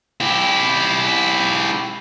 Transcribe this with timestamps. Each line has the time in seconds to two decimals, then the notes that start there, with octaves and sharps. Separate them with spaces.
0.21 E4 G4